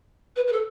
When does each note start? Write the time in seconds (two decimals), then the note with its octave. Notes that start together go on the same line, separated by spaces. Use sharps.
0.36 B4
0.47 B4
0.52 A4